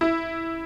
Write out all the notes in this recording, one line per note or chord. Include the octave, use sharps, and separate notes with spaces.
E4